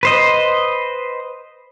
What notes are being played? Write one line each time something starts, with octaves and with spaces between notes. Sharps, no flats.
B4 C5 D#5